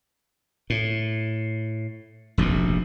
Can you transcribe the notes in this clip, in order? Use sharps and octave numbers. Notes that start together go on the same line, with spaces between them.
A2
F1 A#1 D#2 B2